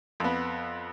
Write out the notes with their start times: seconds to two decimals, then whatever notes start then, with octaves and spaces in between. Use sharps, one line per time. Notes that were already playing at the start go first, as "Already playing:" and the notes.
0.20 F2 B3